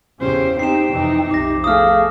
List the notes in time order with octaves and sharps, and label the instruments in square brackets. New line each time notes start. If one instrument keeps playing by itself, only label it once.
[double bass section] E2 C#3 C#4 [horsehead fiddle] G4 C5
[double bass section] C4 [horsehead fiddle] D#4 G4 [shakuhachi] G5 [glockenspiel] C7 E7
[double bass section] F2 C3 E3 [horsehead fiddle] D#4
[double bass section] B1 F2 C3 [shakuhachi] G4 [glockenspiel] D6 A#6
[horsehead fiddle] A3 G#4 [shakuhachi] F5 [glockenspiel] D#6 F6